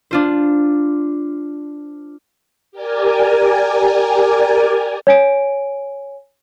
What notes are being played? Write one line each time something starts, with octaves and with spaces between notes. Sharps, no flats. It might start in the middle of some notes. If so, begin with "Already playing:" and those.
D4 F4 C5
G4 A#4 D5 G#5
C#5 G#5 D7